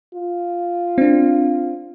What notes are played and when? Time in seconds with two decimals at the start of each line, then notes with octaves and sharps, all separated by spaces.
0.15 F4
0.98 C4 D4